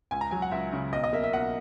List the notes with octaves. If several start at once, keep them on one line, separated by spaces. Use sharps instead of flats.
C#2 G#5
A#5
F#3 G#5
F#5
C#2 E5
C#3
B1 D#5
D#5
A#3 E5
E5
B1 F#5